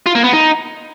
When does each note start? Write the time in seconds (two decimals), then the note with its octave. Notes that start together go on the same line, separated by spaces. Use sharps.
0.06 F4
0.15 A#3
0.24 B3
0.33 D#4